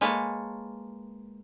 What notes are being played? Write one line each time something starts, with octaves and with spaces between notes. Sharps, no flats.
G#3 A#3 B4 C#5 A5